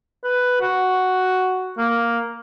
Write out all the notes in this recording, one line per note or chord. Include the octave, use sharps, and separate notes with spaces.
B4
F#4
A#3